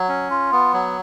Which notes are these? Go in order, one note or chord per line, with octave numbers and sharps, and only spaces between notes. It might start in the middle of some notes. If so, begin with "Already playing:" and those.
Already playing: F#3
C#4
F4
B3
F#3